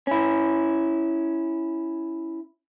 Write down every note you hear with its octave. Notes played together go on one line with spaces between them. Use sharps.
C#4 E4